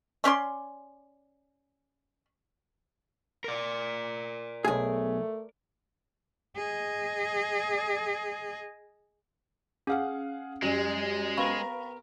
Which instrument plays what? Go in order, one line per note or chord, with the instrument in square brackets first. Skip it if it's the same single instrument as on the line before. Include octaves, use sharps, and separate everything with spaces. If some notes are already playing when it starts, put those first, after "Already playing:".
[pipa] A3 C#4 D5 C6
[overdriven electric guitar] A#4 D5
[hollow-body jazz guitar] B1 G#4 [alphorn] A3
[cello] G#4 D#5
[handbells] C#4 F6 [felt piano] G#4 F5 F#5
[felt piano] F#2 [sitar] G3 [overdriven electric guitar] G#3
[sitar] B3 A#4 [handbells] F5 B5 C#6